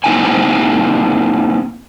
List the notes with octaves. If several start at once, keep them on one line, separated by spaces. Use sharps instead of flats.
A#3 C4 D#4 E4 G5 G#5